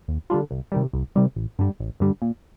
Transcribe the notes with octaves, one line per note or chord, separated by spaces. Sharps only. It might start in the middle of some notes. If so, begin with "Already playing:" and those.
D#2
D3 G3 D4 F4
C2
C3 D#3 G3
C2
C3 D#3 G3
A1
G2 D3 G3
A1
G2 D3 G3
A#2